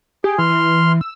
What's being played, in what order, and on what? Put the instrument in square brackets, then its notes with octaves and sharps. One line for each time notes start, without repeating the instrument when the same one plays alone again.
[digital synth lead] G4 [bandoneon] G#4
[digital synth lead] E3 [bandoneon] C6 F6
[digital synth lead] E3
E6